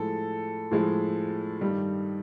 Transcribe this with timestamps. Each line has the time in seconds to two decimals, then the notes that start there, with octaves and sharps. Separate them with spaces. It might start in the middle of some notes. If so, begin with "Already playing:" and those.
Already playing: A2 F3 G#3 A4
0.71 A2 F3 G#3
1.61 G2 D#3 G3